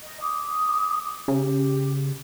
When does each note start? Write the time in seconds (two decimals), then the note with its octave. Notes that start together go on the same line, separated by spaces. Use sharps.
0.02 D#5
0.22 D6 D#6
1.28 C#3 G4